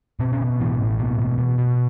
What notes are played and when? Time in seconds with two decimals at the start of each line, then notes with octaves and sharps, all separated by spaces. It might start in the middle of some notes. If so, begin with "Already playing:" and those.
0.20 B2 C4
0.33 C#4
0.40 B2
0.60 A2 E3
0.79 A2
0.99 B2
1.19 B2
1.38 B2
1.58 B2